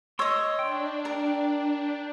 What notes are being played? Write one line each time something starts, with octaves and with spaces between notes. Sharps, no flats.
C#5 D#5 C6 C#6 E6
D4 G5
A#4